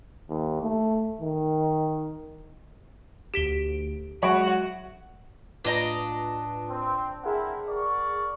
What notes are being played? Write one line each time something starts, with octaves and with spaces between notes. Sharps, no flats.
D#2
A3
D#3
D2 G4 B6 D7 G7
F#3 G#3 F#4 C#5 E5 B5 C#6 D7
A2 D4 F4 B4 D#5 A#5
C4
C4 E4 G#4 A#4 F#5
A#4 D5 C#6